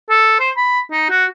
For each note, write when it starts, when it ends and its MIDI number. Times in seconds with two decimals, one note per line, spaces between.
0.10 0.36 69
0.40 0.50 72
0.57 0.80 83
0.91 1.08 63
1.10 1.25 66